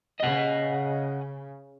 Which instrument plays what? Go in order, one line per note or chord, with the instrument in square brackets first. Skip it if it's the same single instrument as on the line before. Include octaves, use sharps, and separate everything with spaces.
[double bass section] C#3 [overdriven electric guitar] D#5 F#5